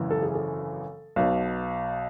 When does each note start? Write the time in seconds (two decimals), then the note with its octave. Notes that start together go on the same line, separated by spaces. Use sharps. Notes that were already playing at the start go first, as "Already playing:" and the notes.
Already playing: G#1 F#2 C#3 E3
0.11 A4
0.22 G#4
0.34 A4
1.16 B1 B2